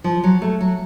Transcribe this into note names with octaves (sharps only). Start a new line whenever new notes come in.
F3
F#3
A3
F#3